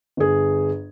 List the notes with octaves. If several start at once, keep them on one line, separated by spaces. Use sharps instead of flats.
G1 G#4